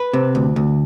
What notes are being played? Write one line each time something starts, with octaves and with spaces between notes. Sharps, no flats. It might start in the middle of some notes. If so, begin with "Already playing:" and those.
Already playing: B4
C3
D2
D2